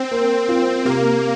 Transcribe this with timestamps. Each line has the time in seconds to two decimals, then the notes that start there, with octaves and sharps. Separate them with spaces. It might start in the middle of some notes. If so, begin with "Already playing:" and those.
Already playing: C4
0.11 A#3
0.49 F4
0.85 C3 A#3